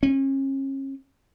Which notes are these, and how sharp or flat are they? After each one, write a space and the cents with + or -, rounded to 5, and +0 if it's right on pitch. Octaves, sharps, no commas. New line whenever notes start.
C#4 -40